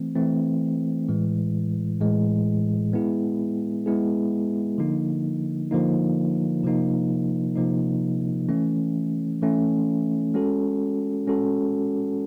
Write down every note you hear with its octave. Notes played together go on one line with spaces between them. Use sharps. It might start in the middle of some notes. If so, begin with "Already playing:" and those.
Already playing: E3 A3 C4
E3 A3 C4
A2 E3 G#3
A2 E3 G#3
G#3 B3 E4 G#4
G#3 B3 E4 G#4
D3 F3 A#3 D#4
D3 F3 A#3 D#4
C3 F3 A#3 D#4
C3 F3 A#3 D#4
E3 A3 C#4
E3 A3 C#4
G#3 C#4 F#4 A4
G#3 C#4 F#4 A4